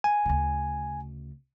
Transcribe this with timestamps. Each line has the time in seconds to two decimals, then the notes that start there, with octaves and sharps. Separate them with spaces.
0.04 G#5
0.26 D2 C#3